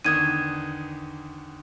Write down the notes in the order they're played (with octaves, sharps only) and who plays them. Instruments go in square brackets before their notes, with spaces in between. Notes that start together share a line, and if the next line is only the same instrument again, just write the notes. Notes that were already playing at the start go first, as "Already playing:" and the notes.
[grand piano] E2 D3 D#3 [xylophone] D#6 G#6 D#7